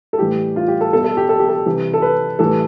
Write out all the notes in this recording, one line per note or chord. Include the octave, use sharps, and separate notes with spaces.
A4
A2 E3 G3 G4
F4
G4
A4
B2 G3 A4
A4
G4
A4
G4
A4
C3 E3 G3
A4
B4
A2 E3 G3 A4